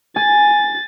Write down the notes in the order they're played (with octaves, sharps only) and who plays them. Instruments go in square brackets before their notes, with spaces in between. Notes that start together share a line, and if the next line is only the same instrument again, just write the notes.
[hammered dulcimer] G#5 [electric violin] A6